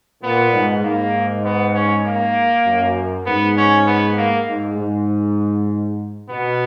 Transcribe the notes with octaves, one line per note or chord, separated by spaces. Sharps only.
A#2 B3
G#2
G#2 A#3
B3
C#4
A#3
F#2
G#2 B3
C#4
B3
A#3
G#2
G#2
B2 B3